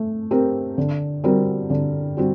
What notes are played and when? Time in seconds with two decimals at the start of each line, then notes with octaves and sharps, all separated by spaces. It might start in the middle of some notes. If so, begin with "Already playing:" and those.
Already playing: A3
0.31 C4 G4 A#4
0.78 D3
1.24 G3 C4 F#4 A#4
1.70 D3
2.17 G3 C4 F#4